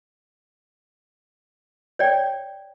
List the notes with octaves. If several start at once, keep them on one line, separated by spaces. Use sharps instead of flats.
C#5 D5 G5